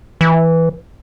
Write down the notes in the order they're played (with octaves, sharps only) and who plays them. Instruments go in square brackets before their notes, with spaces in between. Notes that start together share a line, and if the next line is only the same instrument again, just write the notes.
[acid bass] E3